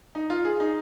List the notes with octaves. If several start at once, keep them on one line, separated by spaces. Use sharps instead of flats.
D#4
F4
G#4
D#4